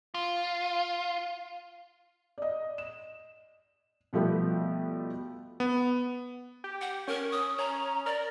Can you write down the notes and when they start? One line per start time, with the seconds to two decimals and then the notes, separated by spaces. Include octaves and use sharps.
0.14 F4
2.38 D5 D#5
2.78 E7
4.13 B2 F3 G3 A3 B3 G4
5.60 B3
6.64 G4
6.81 F#5
7.08 C#4 A#4
7.32 D#6
7.59 C#4 A#5
8.06 A#4 D5